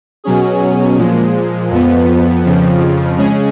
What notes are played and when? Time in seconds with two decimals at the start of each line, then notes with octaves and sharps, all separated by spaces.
0.24 B2 F#3 C#4 G#4
0.97 A#2 F3 G#3
1.70 F2 F3 B3
2.44 F2 C#3 F3
3.18 C#3 G#3 C#4 G#4